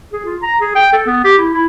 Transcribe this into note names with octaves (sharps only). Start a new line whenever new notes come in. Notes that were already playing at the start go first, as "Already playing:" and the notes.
G#4
F4
A#5
G#4
G5
A4
B3
G4
E4
E4